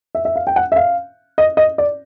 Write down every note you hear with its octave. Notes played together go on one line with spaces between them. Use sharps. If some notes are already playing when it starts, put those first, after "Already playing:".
E5
E5
F5
G5
F#5
E5
F5
D#5
D#5
D5